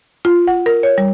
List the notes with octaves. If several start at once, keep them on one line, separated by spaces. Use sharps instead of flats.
F4
F#5
A#4
C#5
G3